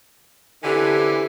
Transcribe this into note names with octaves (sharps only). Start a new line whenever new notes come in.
D3 E3 C4 C#4 G4 A4 G#5